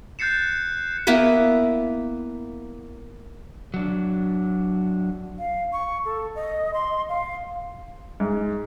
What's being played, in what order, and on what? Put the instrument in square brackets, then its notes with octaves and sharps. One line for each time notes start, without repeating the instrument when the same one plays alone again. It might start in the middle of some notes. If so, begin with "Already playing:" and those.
[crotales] F#6 G6 A6 C7 C#7 E7
[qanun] A#3 B3 E4 B4
[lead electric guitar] F#3 D4
[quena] F5
C#6
A4
D#5
C6
F5
[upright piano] G#2